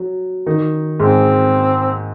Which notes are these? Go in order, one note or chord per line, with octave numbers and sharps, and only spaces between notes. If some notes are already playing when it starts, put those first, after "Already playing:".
Already playing: F#3
D#3 D#4
G#2 G#3 C4